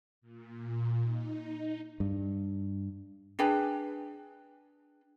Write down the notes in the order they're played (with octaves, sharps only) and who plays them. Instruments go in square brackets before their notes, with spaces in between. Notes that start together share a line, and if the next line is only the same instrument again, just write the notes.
[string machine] A#2
D#4
[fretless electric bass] G2
[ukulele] D4 G#4 B4 G5